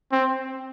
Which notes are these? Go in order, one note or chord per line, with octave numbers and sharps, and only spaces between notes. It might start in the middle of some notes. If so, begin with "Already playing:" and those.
C4